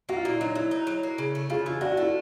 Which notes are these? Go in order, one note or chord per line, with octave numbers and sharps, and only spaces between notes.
A#3 F#4
F4
A#2 E4
F#3 D#4
F#3 E4
D#4
F#3
A#3
C#3
A3
C#3 F4
E3 F4
D4 F#4
F#4
A3 E4
F4